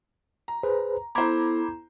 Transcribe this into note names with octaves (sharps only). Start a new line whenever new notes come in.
A#5
G#4 B4 C5
B3 E4 A4 C5 A#5 B5 D6 G#6